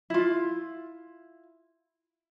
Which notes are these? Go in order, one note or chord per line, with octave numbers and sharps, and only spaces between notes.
E4 F4